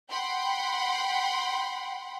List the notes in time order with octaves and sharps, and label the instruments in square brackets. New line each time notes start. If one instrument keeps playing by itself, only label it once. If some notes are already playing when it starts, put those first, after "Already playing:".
[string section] F#5 G5 B5 C6